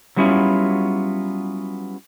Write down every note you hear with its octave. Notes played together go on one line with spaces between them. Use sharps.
F#3 G3 B3 C#4 E4 F4